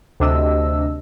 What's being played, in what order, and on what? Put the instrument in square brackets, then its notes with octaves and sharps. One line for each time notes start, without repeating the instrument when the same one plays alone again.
[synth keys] D2 C3 D4 D#5 E6